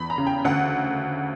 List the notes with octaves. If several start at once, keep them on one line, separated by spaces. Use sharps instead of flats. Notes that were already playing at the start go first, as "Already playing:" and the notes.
Already playing: E2 B5
A#5
C#3
G5
D2 F#5